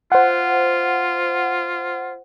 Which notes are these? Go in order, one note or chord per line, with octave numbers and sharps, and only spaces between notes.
F4 C5 F#5